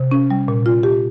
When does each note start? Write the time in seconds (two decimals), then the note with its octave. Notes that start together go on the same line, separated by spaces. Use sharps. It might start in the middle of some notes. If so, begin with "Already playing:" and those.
Already playing: C3
0.11 C#4
0.30 G3
0.48 A#2
0.66 F4
0.83 G4